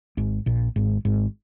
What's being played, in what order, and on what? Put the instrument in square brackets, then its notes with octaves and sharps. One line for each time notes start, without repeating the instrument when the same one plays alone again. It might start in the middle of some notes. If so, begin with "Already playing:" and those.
[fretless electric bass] G#1 G#2
A#1 A#2
G#1 G#2
G#1 G#2